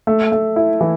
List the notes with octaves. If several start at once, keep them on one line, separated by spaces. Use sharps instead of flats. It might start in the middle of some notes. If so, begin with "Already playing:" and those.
A3
A3
E4
E3